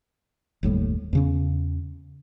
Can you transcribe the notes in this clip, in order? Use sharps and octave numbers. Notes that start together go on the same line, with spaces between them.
F#1 D#2 A2 G3
E2 C#3 C#4